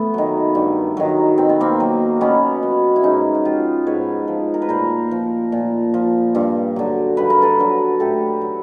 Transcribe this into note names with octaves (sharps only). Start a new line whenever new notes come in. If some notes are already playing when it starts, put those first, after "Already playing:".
Already playing: A3 B3
D#3 F#3
G2
D#3 F#3
B2 C4
B3
A#3 C4
F#3
B2 B3 C#4
F#3
E4
G#2 C#4 D#4
F#4
F3 F4 G4
G#2 B4 C#5
F3
A#4
B4
A#2 A#4 C5
F3
A#2
F3
G2
D3 F#3
G2 B4
A#4
A4 B4
D3 F#3
A2 G4 A4
F#3